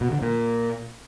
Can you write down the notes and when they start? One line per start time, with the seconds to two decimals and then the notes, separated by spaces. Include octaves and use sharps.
0.01 B2
0.11 D3
0.22 A#2